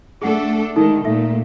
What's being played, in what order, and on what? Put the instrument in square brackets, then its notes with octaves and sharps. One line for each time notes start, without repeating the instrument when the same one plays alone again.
[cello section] A3 D4 A4 [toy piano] G#4 F#5
[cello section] D#3 G#3 [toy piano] D#4 A4
[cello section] A#2 A3 [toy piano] A4 E5